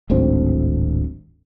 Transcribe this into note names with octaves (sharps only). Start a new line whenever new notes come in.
D1 G#1 D2 C4